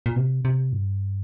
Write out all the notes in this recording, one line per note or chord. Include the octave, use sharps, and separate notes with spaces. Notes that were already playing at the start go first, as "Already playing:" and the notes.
A#2
C3
C3
G2